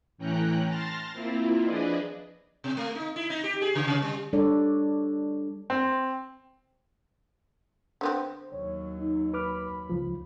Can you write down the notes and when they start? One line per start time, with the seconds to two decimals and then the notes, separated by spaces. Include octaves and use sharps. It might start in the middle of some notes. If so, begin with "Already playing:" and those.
0.18 A2 E3 C#4 G5 A#5 F#6
0.67 A5 C6 F6 A6 A#6
1.13 A#3 C4 E4 F4
1.63 F3 D4 G#4 B4 D5 D#5
2.64 B2
2.77 A3
2.95 D#4
3.16 E4
3.30 D#4
3.44 G4
3.62 G#4
3.75 C#3
3.87 C3
4.02 G3
4.33 G3 D4 A4 C#5 D5
5.70 C4
8.01 D3 B3 C4 C5
8.52 D#2 F#3 C#5
8.98 D#4
9.34 B4 B5 D6 F6
9.90 C#2 F3